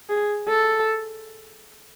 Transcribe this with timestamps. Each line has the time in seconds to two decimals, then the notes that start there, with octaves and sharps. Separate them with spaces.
0.10 G#4
0.48 A4